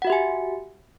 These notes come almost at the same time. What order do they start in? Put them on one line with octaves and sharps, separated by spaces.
F#5 F#4 E5 G4 G#5